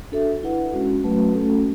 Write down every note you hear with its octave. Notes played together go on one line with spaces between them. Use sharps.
D4 F#4 A4 E5
E4 B4 F#5
G#3 C#4 F#4
F#3 A3 C#4 F#4 B4
A3 C#4 F#4 A4